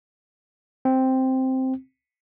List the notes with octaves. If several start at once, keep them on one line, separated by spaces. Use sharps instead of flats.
C4